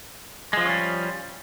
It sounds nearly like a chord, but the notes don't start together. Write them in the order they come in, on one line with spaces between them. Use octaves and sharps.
G#3 F3 F4 C#4 G3